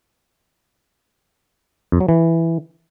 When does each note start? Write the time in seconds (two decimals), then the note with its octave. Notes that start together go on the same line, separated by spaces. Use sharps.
1.92 F2
2.00 F#3
2.09 E3